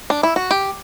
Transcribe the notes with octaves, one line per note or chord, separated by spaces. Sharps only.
D4
E4
F#4
G4